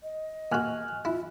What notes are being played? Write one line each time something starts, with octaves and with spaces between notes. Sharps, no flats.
D#5
A#2 F#4 G#5 F6 F#6
E4 F4